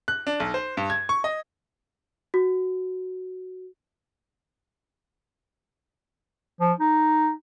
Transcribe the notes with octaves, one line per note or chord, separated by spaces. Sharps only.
F#6
D4
B1
C5
G2
G#6
C#6
D#5
F#4
F3
D#4